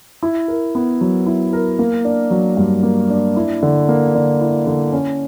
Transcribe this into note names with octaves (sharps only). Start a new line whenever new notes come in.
E4
A#4
B3
F#3
E4
A#4
A#3
D4
F#3
G2
A#3
D4
E4
D3
A#3
D3
E4
D3
C#4